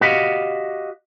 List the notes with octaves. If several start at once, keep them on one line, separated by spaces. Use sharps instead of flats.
F#4 G4 D#5 F5